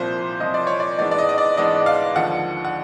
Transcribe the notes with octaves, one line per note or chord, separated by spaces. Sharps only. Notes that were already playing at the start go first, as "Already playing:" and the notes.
Already playing: C2 A#2 F3 C5
C2 A#2 F3 D#5
D5
C#5
D5
G#2 E3 G#3 B3 D4 D5
D5
D#5
D#5
D5
G#2 E3 G#3 B3 D4 D#5
F5
D#2 D3 F3 F#5
F#5